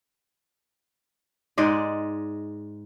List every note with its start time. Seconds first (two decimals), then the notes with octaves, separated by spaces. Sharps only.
1.58 G#2 G#3 D5 D#5